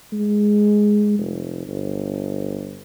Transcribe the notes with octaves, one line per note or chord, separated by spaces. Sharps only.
G#3
F1
G1